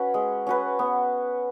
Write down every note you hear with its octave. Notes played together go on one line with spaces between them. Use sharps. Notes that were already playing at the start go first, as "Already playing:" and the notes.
Already playing: C#4 F#4 B4
G#3
C#4 F#4 B4
B3